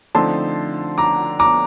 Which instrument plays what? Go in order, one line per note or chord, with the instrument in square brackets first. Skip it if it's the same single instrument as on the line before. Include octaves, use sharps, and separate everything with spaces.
[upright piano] D3 F3 A3 C4 D#4 A5 C6
A#5 D6
A#5 D6